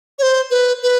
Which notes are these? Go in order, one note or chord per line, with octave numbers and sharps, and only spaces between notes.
C#5
C5
B4
B4